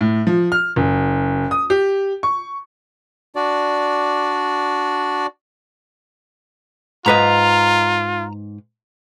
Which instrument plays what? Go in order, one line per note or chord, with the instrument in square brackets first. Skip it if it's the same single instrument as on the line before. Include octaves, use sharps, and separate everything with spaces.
[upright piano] A2
F3
F6
F#1
D#6
G4
C#6
[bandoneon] D4 F#4 D5
[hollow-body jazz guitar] G#2 B4 D#5 [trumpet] F4 [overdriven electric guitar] A#5